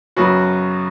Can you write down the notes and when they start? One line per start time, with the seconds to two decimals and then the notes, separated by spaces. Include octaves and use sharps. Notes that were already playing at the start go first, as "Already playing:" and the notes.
0.17 F#2 C#3 F#3 B3 F#4